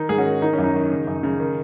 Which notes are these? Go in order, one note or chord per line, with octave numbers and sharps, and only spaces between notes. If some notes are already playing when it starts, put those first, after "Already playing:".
Already playing: D#3 D#4
G#2 G#4
C#4 F#4
D#3
D#3 D#4
C#4
F#2
D#4
D#3
C#3
F#2
C#3
D#3